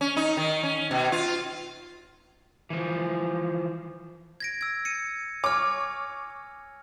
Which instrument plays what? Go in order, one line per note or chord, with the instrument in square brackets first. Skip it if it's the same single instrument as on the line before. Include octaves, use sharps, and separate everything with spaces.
[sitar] C#4
D#4
D#3
C#4
B2
F4
[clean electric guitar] E3 F3
[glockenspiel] G#6 A#6 D7
E6 G#6
C#7 D#7
[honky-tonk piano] C#5 D6 [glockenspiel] G#5 F6